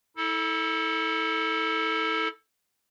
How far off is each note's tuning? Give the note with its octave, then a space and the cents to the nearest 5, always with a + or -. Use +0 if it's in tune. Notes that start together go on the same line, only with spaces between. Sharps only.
E4 -40 A4 +0